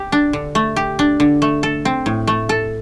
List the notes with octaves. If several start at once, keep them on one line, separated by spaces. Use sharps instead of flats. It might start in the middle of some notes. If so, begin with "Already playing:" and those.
Already playing: G4
D4
D3
A3
G4
D4
D3
A3
A4
C4
A2
A3
A4